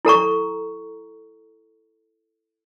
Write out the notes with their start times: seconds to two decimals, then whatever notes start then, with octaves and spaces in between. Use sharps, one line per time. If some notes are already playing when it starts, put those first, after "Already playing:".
0.05 E4 A4 A#5 C#6